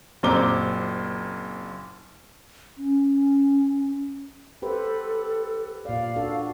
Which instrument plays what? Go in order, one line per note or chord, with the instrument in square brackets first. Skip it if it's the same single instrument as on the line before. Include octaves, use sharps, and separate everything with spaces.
[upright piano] F#1 A#2 C4 A#5 D6 G7
[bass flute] C#4
[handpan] G4 B4 C5 [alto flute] A4
[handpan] A#2 D5 [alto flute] F5
[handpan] D4 F#4 A4